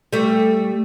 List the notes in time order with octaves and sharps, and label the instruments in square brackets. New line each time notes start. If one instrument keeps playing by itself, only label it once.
[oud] G3 A3